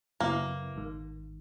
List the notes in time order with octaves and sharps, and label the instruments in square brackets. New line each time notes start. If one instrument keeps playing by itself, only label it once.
[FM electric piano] F#2 C#3 F#3 B3 E4 [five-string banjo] A#3
[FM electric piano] G#1 G#2 D#3